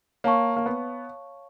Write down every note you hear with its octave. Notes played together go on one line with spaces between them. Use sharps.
A#3 C#5 F5 A5 C#6
A#3
B3